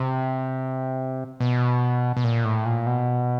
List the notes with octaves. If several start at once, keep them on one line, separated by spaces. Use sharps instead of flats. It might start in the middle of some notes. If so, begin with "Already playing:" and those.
Already playing: C3
B2
B2
A#2
A2
A#2
B2